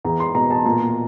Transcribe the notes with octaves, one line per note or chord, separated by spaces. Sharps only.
E2 A#5
C6
B2 A#5
A5
A#2 A#5